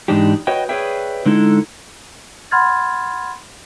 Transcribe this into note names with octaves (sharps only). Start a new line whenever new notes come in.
G#2 E3 G#3 D4 D#4 G4
F#4 B4 C#5 D#5 G5
G#4 B4 C#5 D5 E5 G5
D3 G#3 D#4 E4 A4
F#5 B5 C6 F6 G#6 A6